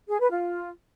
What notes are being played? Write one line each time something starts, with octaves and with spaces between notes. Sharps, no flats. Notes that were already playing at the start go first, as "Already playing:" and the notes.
G#4
B4
F4